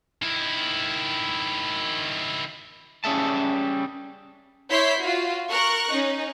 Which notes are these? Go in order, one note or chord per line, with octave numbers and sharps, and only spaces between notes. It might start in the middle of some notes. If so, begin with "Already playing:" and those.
D#3 E4
G3 C#4 G#4 E5 A5
E4 C#5 E5 C6 G6 B6
F4 F#4
A#4 C#6 F#6
C#4 D#4